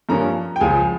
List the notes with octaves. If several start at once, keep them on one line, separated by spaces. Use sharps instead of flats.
G2 F3 A#3 C#4 A#5
G5
C#2 C#3 F3 G#5